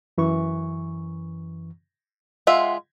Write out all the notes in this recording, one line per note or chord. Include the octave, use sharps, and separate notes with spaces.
F#2 E3 C#6
G#3 F4 E5 F#5